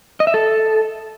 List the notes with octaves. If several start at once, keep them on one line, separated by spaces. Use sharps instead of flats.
D#5
E5
A4